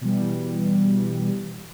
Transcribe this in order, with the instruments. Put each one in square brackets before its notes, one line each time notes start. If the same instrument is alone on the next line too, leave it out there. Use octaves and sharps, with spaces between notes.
[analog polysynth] B2 E3 G3